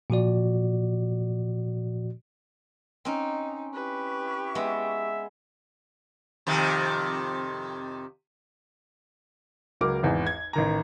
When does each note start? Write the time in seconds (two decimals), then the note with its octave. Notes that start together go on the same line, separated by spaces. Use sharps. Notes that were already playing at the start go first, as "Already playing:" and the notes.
0.10 A#2 F3 F#4 D5
3.05 C4 C#4 D#4
3.73 E4 G4 B4 C#6
4.55 G#3 B3 E5
6.47 F2 C3 D#3
9.81 C#2 F#3 A#4 D6
10.03 G#1 E2
10.27 G#6
10.53 A1 D#3 A#5